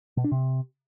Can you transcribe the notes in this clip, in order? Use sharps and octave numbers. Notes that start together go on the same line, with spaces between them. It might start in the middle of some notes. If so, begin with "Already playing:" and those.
B2
D4
C3